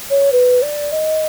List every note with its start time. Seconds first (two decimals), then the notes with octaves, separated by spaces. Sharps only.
0.10 C#5
0.32 B4
0.62 D5
0.92 D#5